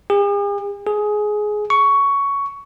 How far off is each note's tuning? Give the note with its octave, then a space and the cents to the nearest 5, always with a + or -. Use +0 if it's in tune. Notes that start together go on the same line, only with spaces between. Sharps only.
G#4 -45
G#4 +15
C#6 +10